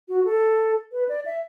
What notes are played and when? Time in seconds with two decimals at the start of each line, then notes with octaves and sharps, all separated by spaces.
0.08 F#4
0.25 A4
0.92 B4
1.09 D5
1.26 E5